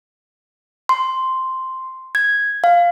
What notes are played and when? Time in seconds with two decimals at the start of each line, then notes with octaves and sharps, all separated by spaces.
0.89 C6
2.15 G#6
2.64 F5